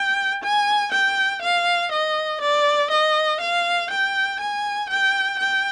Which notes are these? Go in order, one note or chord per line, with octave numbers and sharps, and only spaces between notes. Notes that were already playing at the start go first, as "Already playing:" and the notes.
Already playing: G5
G#5
G5
F5
D#5
D5
D#5
F5
G5
G#5
G5
G5